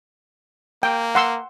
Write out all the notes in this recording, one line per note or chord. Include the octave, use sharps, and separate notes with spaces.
A#3 G5
F#5 C6 E6